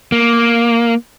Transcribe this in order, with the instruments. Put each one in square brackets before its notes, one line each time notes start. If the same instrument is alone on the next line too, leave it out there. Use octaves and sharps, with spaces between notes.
[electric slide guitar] A#3